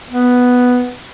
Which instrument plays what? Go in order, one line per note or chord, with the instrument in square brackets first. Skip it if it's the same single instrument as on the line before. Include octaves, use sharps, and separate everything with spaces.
[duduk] B3